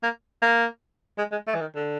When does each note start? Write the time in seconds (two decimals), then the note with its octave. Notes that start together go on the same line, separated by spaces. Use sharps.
0.03 A#3
0.42 A#3
1.18 G#3
1.32 G#3
1.47 A3
1.54 E3
1.60 D#3
1.75 D3